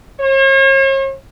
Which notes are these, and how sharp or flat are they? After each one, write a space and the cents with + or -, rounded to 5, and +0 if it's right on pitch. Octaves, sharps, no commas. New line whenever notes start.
C#5 -45